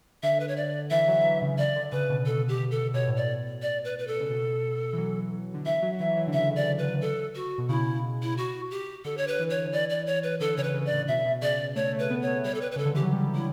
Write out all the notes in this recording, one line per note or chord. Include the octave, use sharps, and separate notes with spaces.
D3 E5
B4
C#5
D5
E3 E5
F#3
E3
C#3
C#3 D5
D3
C#3 B4
B2
B2 A4
G4
A4
B2 C#5
A2
B2 D5
D5
B4
B4
A4
C#3
B2
E3
F#3
D3
E3 E5
F#3
F#3
E3 E5
E3
D3
C#3 E5
D5
B4
A4
F#4
B2
C#3 E4
E4
F#4
G4
D3 A4
D3 C#5
B4
E3
C#5
D3
E3 D5
D5
C#5
B4
D3 A4
C#3 C#5
B4
C#3
D5
A2
B2 E5
B2
C#3 D5
A3 C#5
A3
B4
B3
A3 C#5
G3 C#5
A4
B4
B4
C#3 A4
D3
E3 G4
F#3
G3
E4